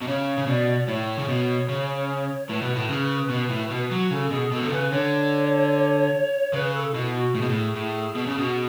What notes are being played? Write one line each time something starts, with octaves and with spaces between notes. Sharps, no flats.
B2
C#3 C#5
C#3
B2 D5
A2 C#5
C#3
B2
C#3
A2 B4
B2
A2
C#3
B2
A2
B2
F#3
C#3 A4
B2 G#4
B2 A4
D3
C#3 B4
D3 C#5
C#3 B4
A4
B2 E4
F#4
A2 G#4
B2
A2
A2
B2
C#3
B2